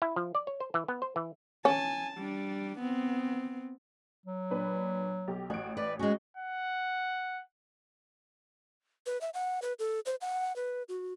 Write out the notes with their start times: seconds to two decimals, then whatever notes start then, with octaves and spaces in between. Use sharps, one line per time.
0.02 E4
0.16 F3
0.35 D5
0.47 C#5
0.60 C5
0.74 E3
0.88 B3
1.02 C5
1.16 E3
1.65 C#4 G#5 A5
2.18 G3 D4
2.79 B3 C4
4.26 F#3
4.50 A#2 D4 B4
5.28 B1 G4
5.50 A1 F#4 D7
5.77 B4 D5
5.99 G#3 C#4 F#4
6.37 F#5
9.06 B4
9.21 E5
9.34 F#5
9.62 B4
9.79 A4
10.06 C5
10.21 F#5
10.56 B4
10.89 F#4